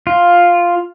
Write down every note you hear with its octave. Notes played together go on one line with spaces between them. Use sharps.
F4